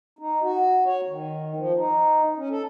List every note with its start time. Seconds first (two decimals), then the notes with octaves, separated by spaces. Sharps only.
0.19 D#4
0.42 F#4
0.86 C#5
1.07 D#3
1.56 F3
1.77 D#4
2.37 C#4
2.50 A4